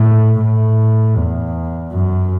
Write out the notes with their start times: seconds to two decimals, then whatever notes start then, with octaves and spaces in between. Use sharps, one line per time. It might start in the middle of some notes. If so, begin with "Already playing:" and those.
Already playing: A2
0.39 A2
1.16 E2
1.92 F#2